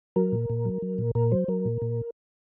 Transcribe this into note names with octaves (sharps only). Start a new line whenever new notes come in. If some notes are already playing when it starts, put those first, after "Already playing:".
F#3 A#4
A#2
A#2
F#3
F#3
A#2
A#2 A#4
F#3 C5
F#3 A#4
A#2
A#2